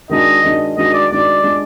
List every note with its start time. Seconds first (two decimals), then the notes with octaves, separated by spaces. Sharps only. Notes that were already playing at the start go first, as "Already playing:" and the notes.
0.10 D#3 G#3 D4 F#4 D#5
0.43 D#3 G#3 D4 F#4
0.77 D#3 G#3 D4 F#4 D#5
0.94 D5
1.11 D#3 G#3 D4 F#4 D5
1.44 G#3 D4 F4